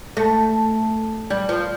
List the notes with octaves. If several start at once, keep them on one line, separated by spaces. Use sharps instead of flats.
A3
G3
F3